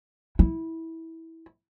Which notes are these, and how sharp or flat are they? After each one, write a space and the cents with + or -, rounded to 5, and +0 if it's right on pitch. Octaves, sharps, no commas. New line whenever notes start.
E4 -15